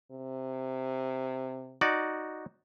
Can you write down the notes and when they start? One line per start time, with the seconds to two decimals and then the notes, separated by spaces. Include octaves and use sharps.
0.11 C3
1.81 D#4 F#4 D5